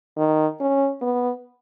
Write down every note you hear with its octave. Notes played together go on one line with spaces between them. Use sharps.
D#3
C#4
B3